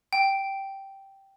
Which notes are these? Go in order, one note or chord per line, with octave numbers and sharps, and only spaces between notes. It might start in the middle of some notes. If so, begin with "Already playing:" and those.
G5